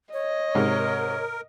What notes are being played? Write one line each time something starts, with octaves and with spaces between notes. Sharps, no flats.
C#5 D#5
G#2 C3 A#4